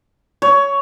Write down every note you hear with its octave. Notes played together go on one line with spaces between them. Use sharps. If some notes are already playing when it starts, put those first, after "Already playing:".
C#5